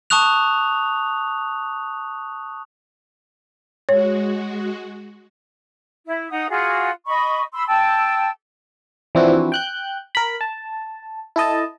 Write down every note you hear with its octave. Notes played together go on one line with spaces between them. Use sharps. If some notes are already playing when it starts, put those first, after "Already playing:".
A5 C#6 D#6 F#6 F7
G#3 F#4 C#5
E4
D#4 F#5 D#6
F4 F#4 G#4
D#5 B5 C#6
B5 C6 E6
G5 A5 E6
E3 F3 C4 D4 E4 F#4
G5 F#6 G6
A#4 B5
A5
E4 A4 D#5 A5